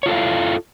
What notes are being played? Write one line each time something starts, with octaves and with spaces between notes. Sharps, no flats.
E4 F4 A4 C#5 F5